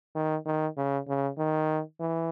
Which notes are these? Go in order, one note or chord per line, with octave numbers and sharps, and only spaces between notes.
D#3
D#3
C#3
C#3
D#3
E3